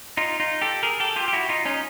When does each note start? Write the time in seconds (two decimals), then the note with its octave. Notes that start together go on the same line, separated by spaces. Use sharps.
0.17 D#4 F4
0.40 D#4 F4
0.61 G4 A4
0.83 G#4 A#4
1.00 G4 A4
1.16 F4 G4
1.28 G4
1.33 E4 F#4
1.49 D#4 F4
1.65 C#4 D#4